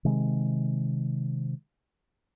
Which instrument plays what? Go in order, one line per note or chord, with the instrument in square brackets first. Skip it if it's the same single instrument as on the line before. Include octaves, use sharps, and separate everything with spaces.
[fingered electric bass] C3 D#3 G#3